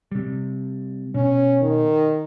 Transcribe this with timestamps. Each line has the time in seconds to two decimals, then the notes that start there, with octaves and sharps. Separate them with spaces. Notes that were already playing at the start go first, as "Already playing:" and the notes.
0.12 C3 G3
1.15 B2 C#4
1.62 D#3